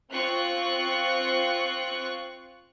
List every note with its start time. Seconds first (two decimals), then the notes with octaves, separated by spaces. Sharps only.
0.12 C4 F4 C#6 F#6